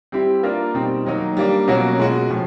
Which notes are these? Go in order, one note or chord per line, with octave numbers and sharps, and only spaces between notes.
G3 C4 E4 G4
A#3 D4 F4 A#4
B2 G3 C4 D#4
D#3 F#3 A#3 D#4
G3 A#3 D4
B2 F#3 A#3 C#4 F#4
B2 G#3 C#4 F#4
A2 F3